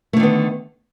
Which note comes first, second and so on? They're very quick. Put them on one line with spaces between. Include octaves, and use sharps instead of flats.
A3 D3 D#3 B3